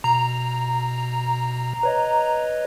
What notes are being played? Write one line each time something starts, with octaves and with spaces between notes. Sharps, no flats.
B2 A#5
B4 C#5 D#5